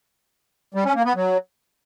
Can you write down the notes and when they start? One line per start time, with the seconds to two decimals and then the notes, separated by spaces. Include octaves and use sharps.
0.74 G3
0.85 C#4
0.95 A#3
1.05 B3
1.15 F#3